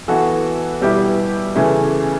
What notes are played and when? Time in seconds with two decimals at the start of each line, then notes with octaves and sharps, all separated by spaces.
0.08 E3 B3 F#4 A4
0.81 B2 G3 B3 E4 G4
1.56 C#3 E3 A3